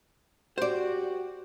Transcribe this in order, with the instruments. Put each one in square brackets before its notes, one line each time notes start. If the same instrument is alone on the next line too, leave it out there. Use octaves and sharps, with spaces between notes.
[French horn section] F#4 G4 [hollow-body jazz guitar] C5 D5